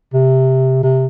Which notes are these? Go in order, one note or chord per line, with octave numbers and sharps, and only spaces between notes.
C3
C3